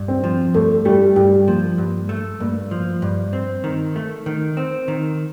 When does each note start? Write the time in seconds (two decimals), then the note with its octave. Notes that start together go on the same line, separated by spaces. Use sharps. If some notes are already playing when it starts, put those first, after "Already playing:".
Already playing: G2
0.08 C4
0.24 F3
0.54 G2 A3
0.85 G3 A3
1.16 G2 G3
1.47 F3 A#3
1.78 G2
2.09 A3
2.40 G2 A#3
2.71 F3
3.02 G2
3.33 C4
3.64 D#3
3.96 A3
4.26 D#3
4.57 C4
4.88 D#3